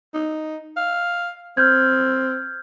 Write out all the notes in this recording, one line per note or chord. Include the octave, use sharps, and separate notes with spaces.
D#4
F5
C4 F6 G6 G#6